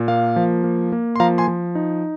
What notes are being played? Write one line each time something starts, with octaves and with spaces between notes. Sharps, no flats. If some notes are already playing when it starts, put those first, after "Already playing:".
Already playing: A#2
A#3 F5
F3
A#3
A#3
C6
F3 F5 A#5
G#5 C6
F3
D#4